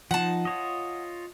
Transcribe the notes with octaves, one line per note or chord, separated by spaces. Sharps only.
F3 D#4 F#5 A5
F4 C#5 D#5